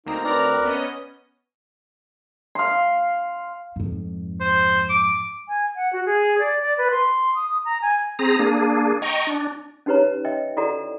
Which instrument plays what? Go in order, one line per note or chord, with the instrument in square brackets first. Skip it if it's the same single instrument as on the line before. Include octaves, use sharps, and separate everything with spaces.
[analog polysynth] D2 C4 A#5 [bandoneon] A#3 [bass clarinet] D#4
[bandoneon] A#4 D5 [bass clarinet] B4
[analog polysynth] B3 C#4 D#5
[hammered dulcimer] F5 C6
[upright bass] F2 G#2
[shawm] C5
D6
[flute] G#5
F#5
F#4
G#4
D5
D5
B4
C6
D#6
A#5
G#5
[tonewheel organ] C4 G#4 A#5 A#6
A#3 D4 G#4
D#5 G5 A#5 C#6
D4
[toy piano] C#4 D#4 G4 B4 C#5 A#5
D#5 E5 G5
E4 F#4 A4 D5 F#5 A#5